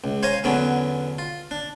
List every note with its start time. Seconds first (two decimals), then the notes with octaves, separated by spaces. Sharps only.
0.04 C#2
0.23 C5 C#5 F5 G#5 A#5
0.44 E2 D3 F#3 B3 C#4
1.19 F4
1.51 D4